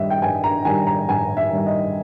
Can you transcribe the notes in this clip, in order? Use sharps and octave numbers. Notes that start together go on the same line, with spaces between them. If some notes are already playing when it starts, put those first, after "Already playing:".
Already playing: G2 D#3 G3 D#5 E5
G5
G2 G#5
A#5
D#3 G3 G#5
A#5
G2 G#5
E5
D#3 G3
D#5